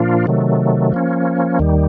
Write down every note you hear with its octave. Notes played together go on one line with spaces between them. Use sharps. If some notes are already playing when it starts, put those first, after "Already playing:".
Already playing: A#2 F3 A#3 D4 F4
C3 D#3 F#3 A3
F3 A#3 C#4
D#2 D#3 G3